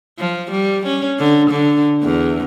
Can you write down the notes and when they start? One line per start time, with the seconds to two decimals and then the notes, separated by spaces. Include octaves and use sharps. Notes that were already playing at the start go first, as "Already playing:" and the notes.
0.19 F3
0.51 G3
0.86 C#4
1.19 D3
1.50 D3
2.03 E2